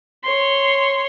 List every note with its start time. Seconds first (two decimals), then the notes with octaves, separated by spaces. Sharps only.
0.24 C#5 C6